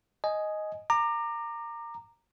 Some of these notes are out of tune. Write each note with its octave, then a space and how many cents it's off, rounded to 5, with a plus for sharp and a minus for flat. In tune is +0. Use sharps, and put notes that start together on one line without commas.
D#5 +0 G#5 +10
A#5 -15 D6 +25